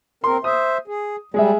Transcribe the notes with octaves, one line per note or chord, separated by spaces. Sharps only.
C4 A#4 C6
C5 E5 D#6
G#4
G3 G#3 G#4 E5